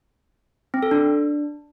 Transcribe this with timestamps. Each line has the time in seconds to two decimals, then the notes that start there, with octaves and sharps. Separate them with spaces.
0.74 C4
0.83 A4
0.91 D4